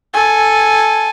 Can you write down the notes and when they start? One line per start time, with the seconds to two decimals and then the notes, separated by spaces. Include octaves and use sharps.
0.14 A4 G#5